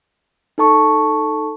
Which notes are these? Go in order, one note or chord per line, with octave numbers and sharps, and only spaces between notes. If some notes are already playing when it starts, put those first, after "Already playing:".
D#4 A4 A5 C#6